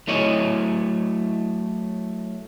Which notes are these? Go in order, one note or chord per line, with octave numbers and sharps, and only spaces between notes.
F#3 A3 E4 C#5 D#5